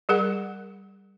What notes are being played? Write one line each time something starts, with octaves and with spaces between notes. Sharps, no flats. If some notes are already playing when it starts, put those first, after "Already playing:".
G3 G#4 A#4 F#5